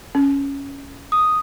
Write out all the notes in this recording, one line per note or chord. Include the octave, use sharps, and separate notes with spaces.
C#4
D#6